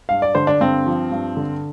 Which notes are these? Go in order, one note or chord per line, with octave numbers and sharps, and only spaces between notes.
G2 F5
D5
D3 C5
D4
G2 C4
F3
G2
D3